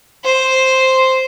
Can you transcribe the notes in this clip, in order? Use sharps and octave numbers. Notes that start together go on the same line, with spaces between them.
C5